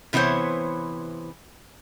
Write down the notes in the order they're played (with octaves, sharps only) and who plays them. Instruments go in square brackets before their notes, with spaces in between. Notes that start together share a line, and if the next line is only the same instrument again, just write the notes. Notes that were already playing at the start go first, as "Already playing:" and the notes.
[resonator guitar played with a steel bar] C3 E3 B3 E4 C5 C#5